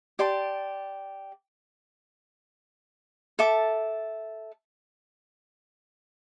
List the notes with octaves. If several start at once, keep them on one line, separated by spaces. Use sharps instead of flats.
G4 D5 A5 C6
A4 E5 A5 D6